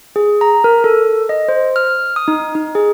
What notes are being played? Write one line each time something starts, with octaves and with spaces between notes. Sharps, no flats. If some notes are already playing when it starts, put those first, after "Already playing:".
G#4
A#5
A#4
A4
D#5
C5
F6
D#6
D#4
D#4
G#4